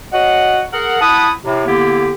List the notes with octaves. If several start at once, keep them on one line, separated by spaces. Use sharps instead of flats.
F#4 C#5 D#5 F#5
G#4 A#4 F#5
E4 F#5 A5 B5 D#6
A2 C3
D3 A#3 B3 E4 G4